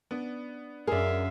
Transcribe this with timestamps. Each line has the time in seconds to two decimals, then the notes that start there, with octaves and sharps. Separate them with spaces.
0.11 B3 D4
0.87 F#2 G#4 A#4 D5 E5 F5 C6